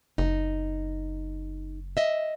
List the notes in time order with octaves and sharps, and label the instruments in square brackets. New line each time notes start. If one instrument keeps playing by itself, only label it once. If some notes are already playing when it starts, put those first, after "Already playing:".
[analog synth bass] F#1 [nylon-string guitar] D#4
[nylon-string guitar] D#5 E5